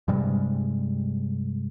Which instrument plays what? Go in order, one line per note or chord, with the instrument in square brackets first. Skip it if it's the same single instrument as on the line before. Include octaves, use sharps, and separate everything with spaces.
[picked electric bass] G2 C3 G3 G#3